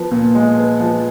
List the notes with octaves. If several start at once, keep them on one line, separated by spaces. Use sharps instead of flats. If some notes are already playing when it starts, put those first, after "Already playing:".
Already playing: F3 B3
A#2
G#3
B3
F3